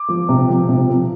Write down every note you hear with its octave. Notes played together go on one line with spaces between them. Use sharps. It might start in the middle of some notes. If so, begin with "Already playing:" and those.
Already playing: D6
F3
C3
F3
C3
F3